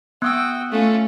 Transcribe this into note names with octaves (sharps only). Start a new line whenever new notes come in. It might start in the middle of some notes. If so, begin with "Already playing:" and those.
B3 F#4 G5 D#6 E6 F#6
A3 C#4 F4